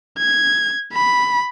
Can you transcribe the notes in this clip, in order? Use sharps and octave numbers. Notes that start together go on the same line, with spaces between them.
G#6
B5